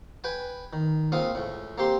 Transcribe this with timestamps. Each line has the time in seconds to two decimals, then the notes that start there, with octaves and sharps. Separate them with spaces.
0.24 B4 G5 G#5
0.73 D#3
1.12 C#2 A#2 C4 F5 D#6
1.35 C#2 A2
1.78 A#3 C4 G4 C6